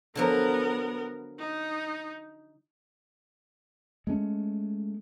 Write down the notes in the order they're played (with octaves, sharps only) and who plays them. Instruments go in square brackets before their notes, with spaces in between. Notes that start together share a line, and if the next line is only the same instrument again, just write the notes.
[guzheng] D3 F3 F#3 [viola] B3 A#4
[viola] D#4
[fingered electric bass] G#3 A3 C#4